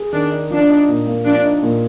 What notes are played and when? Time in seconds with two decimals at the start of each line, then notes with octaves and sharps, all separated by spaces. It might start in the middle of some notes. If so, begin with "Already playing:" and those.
Already playing: G#4
0.13 D#3 D4
0.31 D#4
0.50 F3 D4
0.70 D#4
0.89 A#2
1.07 A#3
1.25 F3 D4
1.45 D#4
1.63 A#2